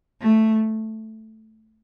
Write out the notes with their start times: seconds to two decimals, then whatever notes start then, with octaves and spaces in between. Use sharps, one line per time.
0.21 A3